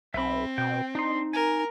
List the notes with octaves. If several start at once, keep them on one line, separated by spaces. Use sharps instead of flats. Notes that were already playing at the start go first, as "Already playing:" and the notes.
B1 C4 E5 B5
B2 G5
D4 D#4 C6
A#4 G#5